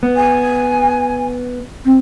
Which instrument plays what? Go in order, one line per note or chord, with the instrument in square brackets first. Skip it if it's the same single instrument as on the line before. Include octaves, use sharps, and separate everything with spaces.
[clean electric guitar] B3
[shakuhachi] G#5
C4